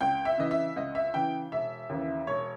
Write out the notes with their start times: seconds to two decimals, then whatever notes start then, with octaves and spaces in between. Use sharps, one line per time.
0.01 C#2 G5
0.25 E5
0.38 C#3 E3 D#5
0.51 E5
0.76 C#2 D#5
0.95 E5
1.13 C#3 E3 G5
1.52 E1 E5
1.89 D#2 C#3 E3
2.27 E1 C#5